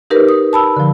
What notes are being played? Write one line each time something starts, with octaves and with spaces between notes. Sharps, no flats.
D#4 G4 A#4 B4
D#6
A5 B5 E6
D3 F3